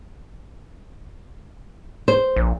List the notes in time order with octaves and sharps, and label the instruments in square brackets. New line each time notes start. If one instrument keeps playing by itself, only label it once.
[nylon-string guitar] C5
[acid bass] A#1